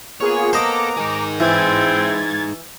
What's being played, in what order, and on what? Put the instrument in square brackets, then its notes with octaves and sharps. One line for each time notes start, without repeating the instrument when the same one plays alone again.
[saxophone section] A#3 B3 [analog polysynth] F4 G#4 [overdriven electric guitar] C#5
[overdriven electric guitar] A4 [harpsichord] C5 D#5 [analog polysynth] A#5 D6
[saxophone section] D#3 [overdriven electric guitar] D#4 G#4
[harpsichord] E3 [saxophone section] G#3 C4 E4 [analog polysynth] G#6 A6